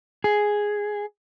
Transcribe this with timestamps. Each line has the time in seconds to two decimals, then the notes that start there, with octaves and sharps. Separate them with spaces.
0.24 G#4